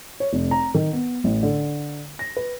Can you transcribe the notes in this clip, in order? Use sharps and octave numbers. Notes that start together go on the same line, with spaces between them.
C#5
F1
A#5
D#3
B3
A1
D3
A#6
B4